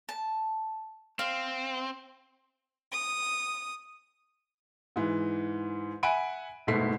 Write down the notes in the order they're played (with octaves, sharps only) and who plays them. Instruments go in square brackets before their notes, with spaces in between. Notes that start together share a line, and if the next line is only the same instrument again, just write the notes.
[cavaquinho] A5
[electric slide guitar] C4 [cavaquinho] F5
[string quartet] D#6
[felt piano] G#2 E3
E5 F#5 G#5 B5 D7 D#7
F#1 G#2 B2 A3 B6 C7